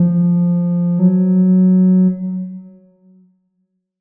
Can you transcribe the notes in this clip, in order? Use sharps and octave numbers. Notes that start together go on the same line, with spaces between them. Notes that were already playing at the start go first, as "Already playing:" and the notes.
Already playing: F3
F#3